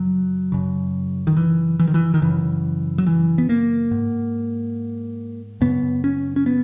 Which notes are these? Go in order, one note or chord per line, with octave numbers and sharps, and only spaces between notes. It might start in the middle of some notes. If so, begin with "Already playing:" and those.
Already playing: F#2 C#3 F#3
F#2 C#3
D#3
E3
E3
D#3
E3
D#3
F#2 C#3 E3
F#3
E3
B3
A#3
G#2
F#2 C#3 B3
C#4
C#4
B3